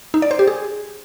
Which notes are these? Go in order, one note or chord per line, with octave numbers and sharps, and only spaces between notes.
D#4
D5
C5
G4
G#4